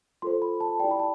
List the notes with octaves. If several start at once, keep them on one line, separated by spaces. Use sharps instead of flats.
F4 A4 C5 C6
B5
A5
E4 G4 D5 G5
B5
A5